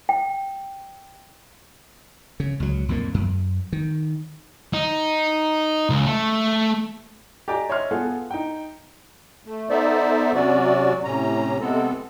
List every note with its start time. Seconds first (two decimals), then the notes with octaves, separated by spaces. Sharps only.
0.09 G5
2.40 C#3
2.60 C#2 F#3
2.89 B1 F2 A#2 A#3
3.14 F#2
3.73 D#3
4.73 D#4
5.90 C#2
6.06 A3
7.48 G4 D5 D#5 G#5 A#5 D6
7.69 C#5 D#5 E5 C6 F6
7.91 B3 F4 G#4 A4
8.31 D#4 G5
9.45 A3
9.70 B3 D#4 A4 C5 D5 E5
10.34 C3 F#3 C#4 F#4 D5
11.04 A2 C3 C#4 A#5
11.61 C3 G#3 B3 C4 A4